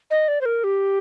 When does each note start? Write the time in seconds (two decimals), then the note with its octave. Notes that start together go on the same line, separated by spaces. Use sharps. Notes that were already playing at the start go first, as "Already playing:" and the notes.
0.11 D#5
0.28 D5
0.41 C5
0.45 A#4
0.64 G4